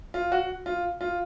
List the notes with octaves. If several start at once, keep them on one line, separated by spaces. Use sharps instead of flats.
F4
F#4
F4
F4